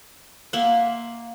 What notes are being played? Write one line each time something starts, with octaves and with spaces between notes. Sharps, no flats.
A#3 E5 F#5 C6